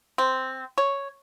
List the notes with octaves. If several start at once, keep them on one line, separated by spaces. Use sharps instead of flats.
C4
C#5